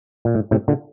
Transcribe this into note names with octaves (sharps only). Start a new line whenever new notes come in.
A#2
A2
A2 C3
A#2 D3